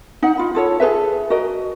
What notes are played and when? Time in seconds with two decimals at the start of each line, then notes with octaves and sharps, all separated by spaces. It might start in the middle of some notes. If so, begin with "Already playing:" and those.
0.23 D#4 F#5
0.37 F4 B5
0.55 F4 A4 C#5
0.80 G#4 A4 B4 E5
1.30 F#4 A#4 D#5